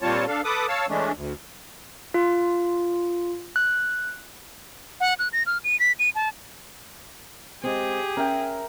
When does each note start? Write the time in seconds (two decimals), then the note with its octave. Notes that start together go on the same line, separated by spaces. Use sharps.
0.01 A#2 G3 C4 F4 C#5 A5
0.27 D4 A4 F5
0.44 A4 B4 D6 D#6
0.68 C#5 F5 A5 E6
0.88 E3 G#3 A3 C#4 D4
1.15 D2
2.14 F4
3.56 F#6
5.00 F#5
5.19 F#6
5.33 A#6
5.46 F6
5.64 D#7
5.80 B6
5.99 D#7
6.15 A5
7.64 G#3 C4 G4 G#4
8.17 C#4 A#4 E5 G5